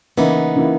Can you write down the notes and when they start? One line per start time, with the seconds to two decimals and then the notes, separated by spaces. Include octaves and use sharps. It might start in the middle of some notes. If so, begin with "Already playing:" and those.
0.18 C#3 E3 A#3 B3 D#4 E4
0.56 C#3 E3 A#3 E4